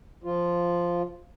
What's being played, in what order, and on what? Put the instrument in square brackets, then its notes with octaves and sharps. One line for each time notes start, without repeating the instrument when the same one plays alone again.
[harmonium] F3 F4